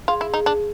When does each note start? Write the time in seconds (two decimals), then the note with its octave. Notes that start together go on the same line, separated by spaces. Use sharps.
0.08 F4 G#4
0.21 E4
0.34 D#4
0.46 D4